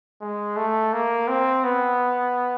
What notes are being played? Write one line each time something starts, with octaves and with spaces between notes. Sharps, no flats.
G#3
A3
A#3
C4
B3